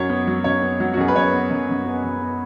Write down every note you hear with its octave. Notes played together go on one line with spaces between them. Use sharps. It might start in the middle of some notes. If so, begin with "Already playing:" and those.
Already playing: F#2 F#3 C#5
B3
F#3
F#2 C#5
B3
F#3
F#4
F#2 G#4
B4
F#2 C#5
B3
F#2
F#2
B3
F#2
B3